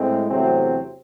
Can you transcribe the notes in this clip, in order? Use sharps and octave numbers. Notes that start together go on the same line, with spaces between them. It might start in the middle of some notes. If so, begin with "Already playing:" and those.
Already playing: A2 G#3 C4
E2 C3 F#3 A3 C4